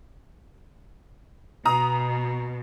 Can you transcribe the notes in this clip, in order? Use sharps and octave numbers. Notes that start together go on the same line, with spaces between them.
B2 A#5 D#6